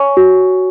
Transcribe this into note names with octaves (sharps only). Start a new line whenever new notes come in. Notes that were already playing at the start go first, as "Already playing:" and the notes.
Already playing: C#5 G#5 C#6
F#4